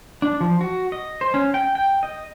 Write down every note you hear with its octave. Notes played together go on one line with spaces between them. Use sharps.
D4
F3
F#4
D#5
C5
C#4
G5
G5
D#5